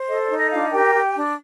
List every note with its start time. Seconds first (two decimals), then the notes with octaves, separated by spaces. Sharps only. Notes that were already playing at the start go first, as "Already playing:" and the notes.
Already playing: C5
0.09 A4 D#5
0.22 D5
0.30 D#4
0.37 D#5
0.51 D4 F4 F5
0.72 G4 A#4 G5
0.94 G4
1.15 D4